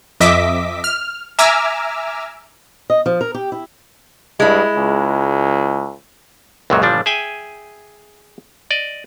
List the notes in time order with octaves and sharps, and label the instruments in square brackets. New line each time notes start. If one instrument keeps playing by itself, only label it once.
[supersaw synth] F2 D#5 E5 D6 B6
F6
E5 G#5 A#5 D6 E6 F6
[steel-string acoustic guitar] D#5
F3
A#4
G4
E4
[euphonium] G2 [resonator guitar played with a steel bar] G#3 E4
[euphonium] C#2
[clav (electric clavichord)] C#2 F#2 A#2 C#3 F#3
G1 A#2 E3 F3 G3 D4
G#4 E5 G5 G#5
D5 D#5